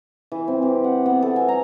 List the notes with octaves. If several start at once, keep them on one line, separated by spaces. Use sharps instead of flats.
E3
C4
G4
F#5
B3
A4
G#5
A#5